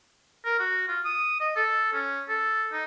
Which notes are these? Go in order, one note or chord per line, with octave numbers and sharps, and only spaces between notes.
A#4
F#4
F4
D#6
D#5
A4
C#4
A4
D#4